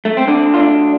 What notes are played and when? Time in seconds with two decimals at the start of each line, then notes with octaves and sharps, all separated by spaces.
0.05 A3
0.17 C4
0.28 D2 D3 D4
0.54 F4
0.60 D4